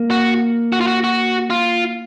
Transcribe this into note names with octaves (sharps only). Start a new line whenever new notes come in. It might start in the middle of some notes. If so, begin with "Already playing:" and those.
Already playing: A#3
F#4
F#4
F4
F#4
F#4
F4